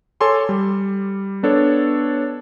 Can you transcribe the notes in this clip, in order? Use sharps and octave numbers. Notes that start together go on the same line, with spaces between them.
A4 C#5 G#5 C6 D6
G3
B3 D4 A4 C#5